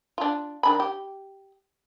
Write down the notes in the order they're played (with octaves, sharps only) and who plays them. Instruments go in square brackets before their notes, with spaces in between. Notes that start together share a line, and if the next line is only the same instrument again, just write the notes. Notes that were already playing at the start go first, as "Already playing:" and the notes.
[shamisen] D4 F4
D#3 D4 B5
G4